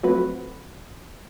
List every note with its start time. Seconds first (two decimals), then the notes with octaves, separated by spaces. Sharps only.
0.03 F3 F#3 A3 C4 F#4 B4